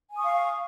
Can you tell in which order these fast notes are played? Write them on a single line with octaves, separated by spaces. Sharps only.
G#5 D#6 C#6 F5